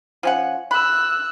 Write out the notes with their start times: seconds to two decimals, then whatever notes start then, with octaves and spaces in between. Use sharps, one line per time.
0.23 F3 C#4 F#5
0.71 B5 E6 F#6